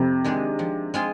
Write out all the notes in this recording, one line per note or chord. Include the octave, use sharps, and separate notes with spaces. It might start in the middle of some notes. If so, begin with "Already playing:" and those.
Already playing: F2 C3 C4
D#3 G#3 D4 G#4
F3
G#3 C4 F4 G#4